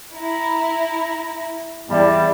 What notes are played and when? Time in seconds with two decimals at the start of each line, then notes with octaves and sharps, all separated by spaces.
0.15 E4 A#5
1.91 E2 G3 D5 E5 A5 B5